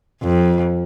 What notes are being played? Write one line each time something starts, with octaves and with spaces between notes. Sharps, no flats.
F2